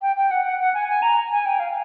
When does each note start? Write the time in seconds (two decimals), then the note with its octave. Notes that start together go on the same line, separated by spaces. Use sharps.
0.02 G5
0.17 G5
0.31 F#5
0.45 F#5
0.60 F#5
0.74 G#5
0.88 G#5
1.02 A#5
1.31 G#5
1.45 G5
1.60 F5